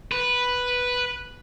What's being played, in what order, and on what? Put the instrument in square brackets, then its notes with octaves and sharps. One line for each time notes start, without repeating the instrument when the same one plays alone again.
[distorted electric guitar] B4